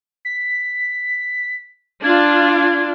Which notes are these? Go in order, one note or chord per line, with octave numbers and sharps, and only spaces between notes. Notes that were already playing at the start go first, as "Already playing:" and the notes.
B6
D4 F4 G#6